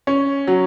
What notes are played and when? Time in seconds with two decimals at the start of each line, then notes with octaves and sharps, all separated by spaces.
0.07 C#4
0.48 F#3